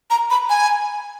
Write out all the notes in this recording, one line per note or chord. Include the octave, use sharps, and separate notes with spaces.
A#5
B5
G#5